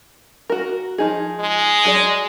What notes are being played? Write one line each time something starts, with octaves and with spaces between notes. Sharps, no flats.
F#4 A#4
F3 D#4 G#4
G#3
F#3 G#4 D5